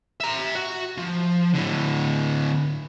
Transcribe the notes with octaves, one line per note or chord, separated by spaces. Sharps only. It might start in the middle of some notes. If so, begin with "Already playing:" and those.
E5 A#5
F#4
F3
A2 D3